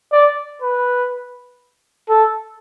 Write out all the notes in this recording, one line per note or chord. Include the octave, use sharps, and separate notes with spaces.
D5
B4
A4